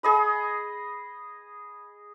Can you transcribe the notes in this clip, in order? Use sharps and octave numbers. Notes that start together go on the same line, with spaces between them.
G#4 D#5 B5